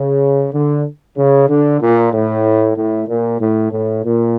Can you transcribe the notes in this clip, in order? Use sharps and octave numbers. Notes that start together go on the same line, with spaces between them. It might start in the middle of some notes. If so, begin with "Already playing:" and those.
Already playing: C#3
D3
C#3
D3
A#2
A2
A2
A#2
A2
A2
A#2